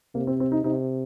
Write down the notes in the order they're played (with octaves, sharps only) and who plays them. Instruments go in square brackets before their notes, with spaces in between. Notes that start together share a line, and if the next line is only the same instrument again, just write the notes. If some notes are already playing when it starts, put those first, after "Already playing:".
[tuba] C3 [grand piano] A#3
[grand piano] C4
C4
D#4
[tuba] C3 [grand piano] D#4